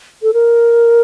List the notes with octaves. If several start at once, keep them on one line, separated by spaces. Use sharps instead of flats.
A4
A#4